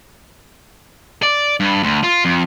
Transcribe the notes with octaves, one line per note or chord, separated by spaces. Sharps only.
D5
G2
D2
F4
F2